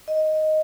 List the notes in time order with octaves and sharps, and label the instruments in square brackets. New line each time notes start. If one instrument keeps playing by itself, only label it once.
[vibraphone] D#5